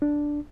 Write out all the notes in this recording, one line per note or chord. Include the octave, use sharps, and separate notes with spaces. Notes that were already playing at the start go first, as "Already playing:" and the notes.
D4